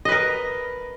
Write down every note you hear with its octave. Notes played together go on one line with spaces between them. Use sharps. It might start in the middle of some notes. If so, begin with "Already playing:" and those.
A#4 B4 D#5